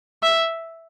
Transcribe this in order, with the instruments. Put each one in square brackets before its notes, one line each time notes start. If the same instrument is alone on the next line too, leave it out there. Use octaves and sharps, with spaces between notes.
[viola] E5